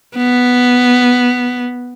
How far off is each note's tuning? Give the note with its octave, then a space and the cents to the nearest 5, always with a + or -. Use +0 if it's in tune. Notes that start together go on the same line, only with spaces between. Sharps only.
B3 +0